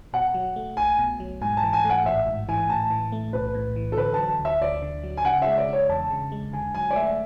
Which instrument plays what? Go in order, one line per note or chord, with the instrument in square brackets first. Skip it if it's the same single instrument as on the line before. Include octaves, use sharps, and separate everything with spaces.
[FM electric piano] B2 [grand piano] F#5
[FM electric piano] F#3
A3
[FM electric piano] B1 [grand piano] G#5
[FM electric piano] B2
F#3
[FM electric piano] G#2 [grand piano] G#5
[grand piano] A5
[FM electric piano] E3
[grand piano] G#5
[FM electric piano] A3
[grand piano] F#5
[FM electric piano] A1 [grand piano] E5
[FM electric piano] G#2
[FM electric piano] E3 [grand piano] G#5
[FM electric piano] A2 [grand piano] A5
[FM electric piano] E3
A3
[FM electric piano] B1 [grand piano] B4
[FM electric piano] A2
E3
[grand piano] A4
[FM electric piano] D3 [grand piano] B4
[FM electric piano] F#3 [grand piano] A5
[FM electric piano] D2
[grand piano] E5
[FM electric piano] D2 [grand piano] D5
[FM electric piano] D3
F#3
[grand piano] G#5
[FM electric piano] C#3 [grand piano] F#5
[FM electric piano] G#3 [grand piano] E5
[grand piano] D5
[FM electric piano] D4 [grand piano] C#5
[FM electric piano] E2 [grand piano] A5
[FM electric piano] C#3
G#3
[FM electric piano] D3 [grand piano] G#5
[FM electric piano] F#3 [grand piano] G#5
[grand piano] D5
[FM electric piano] A3 [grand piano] E5